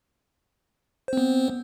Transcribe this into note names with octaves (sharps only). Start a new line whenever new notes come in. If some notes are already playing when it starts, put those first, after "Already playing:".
B3 C4 C5